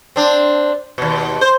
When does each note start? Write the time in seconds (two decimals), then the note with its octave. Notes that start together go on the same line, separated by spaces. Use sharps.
0.16 C4 D4
0.98 D#2 B2
1.41 C5